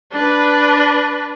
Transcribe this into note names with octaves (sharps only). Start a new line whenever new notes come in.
D4 B4